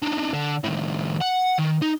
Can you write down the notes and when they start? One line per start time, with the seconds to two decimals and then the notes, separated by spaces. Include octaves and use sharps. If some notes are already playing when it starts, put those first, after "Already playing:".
0.03 D4 D#4
0.34 D3
0.64 A2 D#3
1.21 F#5
1.59 D#3
1.82 D#4